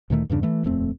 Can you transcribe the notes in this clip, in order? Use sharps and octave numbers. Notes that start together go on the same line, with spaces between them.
D2 A#2 D#3 A3
E2 G2 C#3 D4
E3 A3
D#1 F2 A3 C4